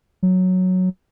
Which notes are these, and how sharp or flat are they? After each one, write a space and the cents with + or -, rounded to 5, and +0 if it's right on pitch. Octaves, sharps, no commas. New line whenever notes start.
F#3 -5